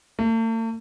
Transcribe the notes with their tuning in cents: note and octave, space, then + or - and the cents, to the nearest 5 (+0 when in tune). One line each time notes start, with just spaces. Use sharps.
A3 +45